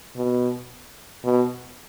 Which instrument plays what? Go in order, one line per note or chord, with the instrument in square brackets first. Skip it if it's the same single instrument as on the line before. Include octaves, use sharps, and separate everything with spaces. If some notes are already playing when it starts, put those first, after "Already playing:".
[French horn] B2
B2